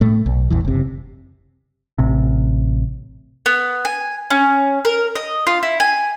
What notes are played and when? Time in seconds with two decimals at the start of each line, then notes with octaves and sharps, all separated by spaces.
0.01 A2 A3
0.26 B1
0.50 A1 E2 E3
0.65 F#1 C3
1.98 A1 C3
3.46 B3
3.85 G#5
4.30 C#4
4.85 A#4
5.15 D#5
5.47 F4
5.63 E4
5.80 G#5